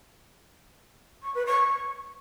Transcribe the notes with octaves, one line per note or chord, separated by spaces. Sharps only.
C#6
B4
C#6